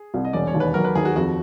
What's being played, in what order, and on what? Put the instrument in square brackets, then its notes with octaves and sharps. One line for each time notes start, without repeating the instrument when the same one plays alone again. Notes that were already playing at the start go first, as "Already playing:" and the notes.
Already playing: [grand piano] G#4
[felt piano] C2
[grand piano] D#5
[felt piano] E1 [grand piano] D5
[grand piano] C#5
[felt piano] D#2
[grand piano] B4
[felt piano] F#3 [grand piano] A#4
[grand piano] B4
[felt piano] D#2 [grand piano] G#4
[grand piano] F#4
[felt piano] F2 [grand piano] F#4